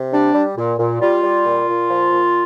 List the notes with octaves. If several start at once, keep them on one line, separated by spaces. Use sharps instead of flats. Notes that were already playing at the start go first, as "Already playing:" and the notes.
Already playing: C3
G3 D4
G3
A#2
A#2
G3 F4
G3
A#2
A#2
F3
A#2